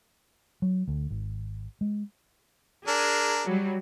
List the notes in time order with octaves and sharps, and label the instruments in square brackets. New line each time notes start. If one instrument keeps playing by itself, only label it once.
[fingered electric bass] F#3
D2
G#1
G#3
[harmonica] D4 A#4 [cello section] G#4
[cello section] F#3 G3